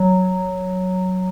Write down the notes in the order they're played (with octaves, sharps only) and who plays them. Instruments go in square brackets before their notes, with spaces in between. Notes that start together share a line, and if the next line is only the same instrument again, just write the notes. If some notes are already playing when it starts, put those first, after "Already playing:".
Already playing: [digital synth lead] F#3